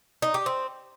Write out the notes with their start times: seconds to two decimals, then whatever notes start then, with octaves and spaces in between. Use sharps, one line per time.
0.22 D#4
0.34 G4
0.46 C4